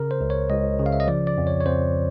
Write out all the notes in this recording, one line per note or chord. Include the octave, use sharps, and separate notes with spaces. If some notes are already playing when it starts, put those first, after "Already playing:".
Already playing: C#3 A#4
C5
C#2
C#5
C#2 D#5
C#3
F5
E5
D#5
F3 D5
D5
F2
C#5
C#5
F2 C5